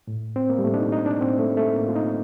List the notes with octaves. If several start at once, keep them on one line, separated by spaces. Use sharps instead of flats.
A2
C4
A#3
G3
A2 A3
D4
D#4
D#4
D4
A2 C4
A3
A3
A2 A#3
F4
D#4